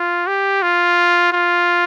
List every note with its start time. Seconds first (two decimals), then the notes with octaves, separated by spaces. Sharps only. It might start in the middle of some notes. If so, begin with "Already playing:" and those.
Already playing: F4
0.27 G4
0.62 F4
1.32 F4